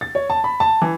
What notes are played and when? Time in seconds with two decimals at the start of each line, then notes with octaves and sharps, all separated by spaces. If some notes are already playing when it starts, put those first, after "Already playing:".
0.01 A6
0.15 C#5
0.30 A5
0.44 B5
0.60 A5
0.82 E3